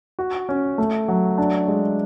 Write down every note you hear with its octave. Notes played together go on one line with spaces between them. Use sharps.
F#4
C#4
A3
F#3
D4
G#3